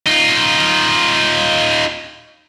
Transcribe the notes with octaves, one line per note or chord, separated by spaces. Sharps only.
D#4 F4